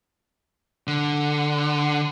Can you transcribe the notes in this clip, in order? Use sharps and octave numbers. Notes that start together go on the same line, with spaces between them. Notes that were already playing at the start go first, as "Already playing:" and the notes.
D3